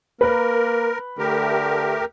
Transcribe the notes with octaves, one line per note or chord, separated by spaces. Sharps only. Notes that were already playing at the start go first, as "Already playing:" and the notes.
A#3 A#4 B4
D3 A3 G4 A#4